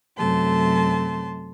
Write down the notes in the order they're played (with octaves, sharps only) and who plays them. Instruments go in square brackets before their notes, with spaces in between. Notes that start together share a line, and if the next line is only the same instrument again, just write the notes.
[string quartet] F#2 C3 F#3 A3 A5 C6